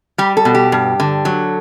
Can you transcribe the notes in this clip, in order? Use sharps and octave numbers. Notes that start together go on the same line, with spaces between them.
G3 G4
A4
B2
G4
G2
D3
F#3